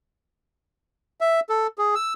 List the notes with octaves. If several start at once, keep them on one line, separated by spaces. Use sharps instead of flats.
E5
A4
G#4
E6